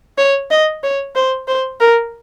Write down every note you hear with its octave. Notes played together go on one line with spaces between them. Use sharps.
C#5
D#5
C#5
C5
C5
A#4